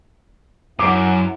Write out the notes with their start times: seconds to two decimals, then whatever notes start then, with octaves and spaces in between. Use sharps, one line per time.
0.79 F#2 E4 F#5 D6